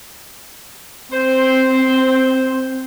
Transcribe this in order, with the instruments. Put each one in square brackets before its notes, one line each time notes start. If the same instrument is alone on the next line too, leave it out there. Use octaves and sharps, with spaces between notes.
[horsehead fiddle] C4 [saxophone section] C5